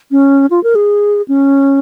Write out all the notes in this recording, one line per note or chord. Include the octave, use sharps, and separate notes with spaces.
C#4
F4
A#4
G#4
C#4